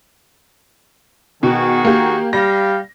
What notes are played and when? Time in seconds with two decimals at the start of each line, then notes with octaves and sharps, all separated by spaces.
1.43 B2 D#3 F#4 G#4
1.85 A#3 G4
2.33 G3 F5 A#6